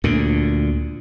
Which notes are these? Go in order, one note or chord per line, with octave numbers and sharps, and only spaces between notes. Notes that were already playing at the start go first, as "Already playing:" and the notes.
D2 A#2 D3